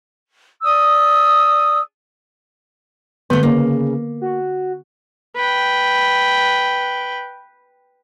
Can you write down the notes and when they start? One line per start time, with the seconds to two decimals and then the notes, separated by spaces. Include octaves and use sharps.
0.63 D5 D#6 E6
3.30 D3 A3 B3 G6
3.43 C#3 A#3
4.22 F#4
5.36 B4 G5